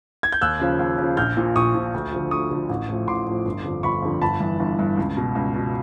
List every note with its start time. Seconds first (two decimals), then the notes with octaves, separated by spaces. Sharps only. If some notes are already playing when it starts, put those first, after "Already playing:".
0.23 G#6
0.32 G6
0.41 D#2 E6 F#6
0.60 C#3 F3
0.79 D#2
0.98 C#3 F3
1.17 A#1 F6 G6
1.37 A#2 F3
1.56 A#1 C#6 D#6
1.75 A#2 F3
1.94 D2
2.12 D3 F3
2.31 D2 C#6 D#6
2.51 D3 F3
2.69 A1
2.89 A2 F3
3.07 A1 C6 D6
3.27 A2 F3
3.45 G1
3.64 F2 D3 F3
3.83 G1 B5 C#6
4.02 F2 D3 F3
4.22 G1 A5 B5
4.40 G2 E3
4.60 G1
4.79 G2 E3
4.97 C#2
5.17 B2
5.35 C#2
5.55 B2